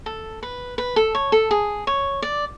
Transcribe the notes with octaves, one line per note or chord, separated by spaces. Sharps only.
A4
B4
B4
A4
C#5
A4
G#4
C#5
D5